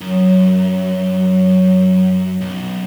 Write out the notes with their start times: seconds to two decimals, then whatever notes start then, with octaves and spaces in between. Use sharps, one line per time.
0.01 F#2 F#3
2.41 B1